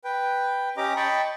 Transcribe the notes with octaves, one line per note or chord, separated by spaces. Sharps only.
B4 G5
C#4 G4 D#5 A#5 D6
D#5 G5 A5 B5 C#6